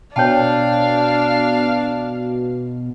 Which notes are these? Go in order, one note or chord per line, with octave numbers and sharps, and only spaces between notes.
B2 D4 C#5 F5 G5 A5